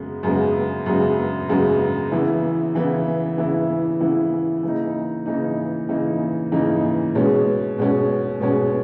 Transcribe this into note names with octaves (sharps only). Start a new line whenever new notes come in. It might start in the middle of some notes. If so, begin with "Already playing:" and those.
Already playing: F#2 C#3 G#3 B3
F#2 C#3 G#3 B3
F#2 C#3 G#3 B3
F#2 C#3 G#3 B3
C#3 E3 B3 E4
C#3 E3 B3 E4
C#3 E3 B3 E4
C#3 E3 B3 E4
C#3 E3 A#3 D#4
C#3 E3 A#3 D#4
C#3 E3 A#3 D#4
C#3 E3 A#3 D#4
B2 G#3 C#4
B2 G#3 C#4
B2 G#3 C#4